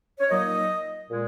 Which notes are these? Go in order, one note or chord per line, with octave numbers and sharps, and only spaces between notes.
C#5
A#2 F#3 A#3 D#4 D#5
A#2 G#3